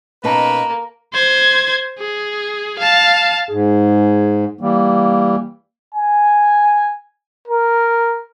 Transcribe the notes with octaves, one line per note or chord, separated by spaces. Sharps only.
B2 A#3 C#4 D#4 A#4 B4 A5 A#5
C5 G#6
G#4
F5 A5
G#2 G#4
E3 G3 A#3
G#5
A#4